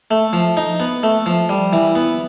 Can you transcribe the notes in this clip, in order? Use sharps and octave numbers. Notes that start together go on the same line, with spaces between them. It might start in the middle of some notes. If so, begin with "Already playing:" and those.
A3
F3
D#4
B3
A3
F3
G3
E3
B3